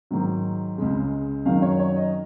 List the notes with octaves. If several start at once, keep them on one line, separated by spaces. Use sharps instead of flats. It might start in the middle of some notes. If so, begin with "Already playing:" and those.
G#2 D#3 F#3
C#2 C#3 G#3
F#2 D#3 F#3 F5
C#5
C#5
D#5